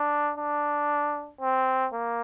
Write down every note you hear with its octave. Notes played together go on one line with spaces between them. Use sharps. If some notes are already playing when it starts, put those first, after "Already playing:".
Already playing: D4
D4
C4
A#3